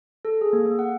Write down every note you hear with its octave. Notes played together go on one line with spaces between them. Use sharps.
A4
G#4
A#3
A#3
F#5